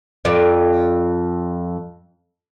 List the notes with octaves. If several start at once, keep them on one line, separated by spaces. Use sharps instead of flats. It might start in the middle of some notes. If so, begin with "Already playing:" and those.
F2 D5